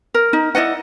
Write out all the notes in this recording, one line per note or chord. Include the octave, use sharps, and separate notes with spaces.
A#4
D#4
E4 D5 D#5 F#5